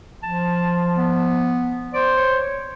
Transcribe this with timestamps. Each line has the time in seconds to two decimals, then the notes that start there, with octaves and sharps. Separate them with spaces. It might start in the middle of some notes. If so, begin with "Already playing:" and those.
0.23 F3 A5
0.96 B3
1.93 C5 D5
2.17 C#5